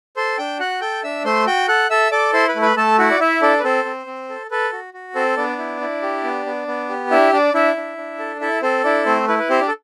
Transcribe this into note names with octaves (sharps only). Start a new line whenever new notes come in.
A4 C5 C6
D4 G5 G6
F#4 F#5 F#6
A4 G5 G6
D4 E5 E6
A3 C5 C6
F#4 G5 G6
A4 F#5 F#6
A4 E5 E6
A4 D5 D6
E4 C5 C6
B4 B5
A3
B4 B5
A3 A4 A5
E4 F#4 F#5
D5
E4 E5
D4 A4 D5
B4
C4 A4 C5
C4
C4
A4
A4 B4
F#4
F#4
C4 A4 C5
B3 D4 D5
E4
E4
G4
B3
B3
B3
G4
D4 E4 E5
D4 D5
D4 E4 E5
D4
D4
A4
E4 A4 E5
C4 A4 C5
D4 E4 D5
A3 C4 C5
E4 B4
B4
C4 G4 C5
D4 D5
A4